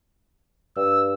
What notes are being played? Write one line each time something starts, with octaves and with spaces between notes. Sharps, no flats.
G2 E6